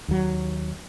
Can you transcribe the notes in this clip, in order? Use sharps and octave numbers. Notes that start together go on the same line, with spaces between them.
D#2 F#3